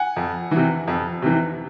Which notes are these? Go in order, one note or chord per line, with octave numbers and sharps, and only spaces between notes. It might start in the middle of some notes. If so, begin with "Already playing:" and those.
Already playing: F#5 G#5
F2
C3 E3
F2
C3 E3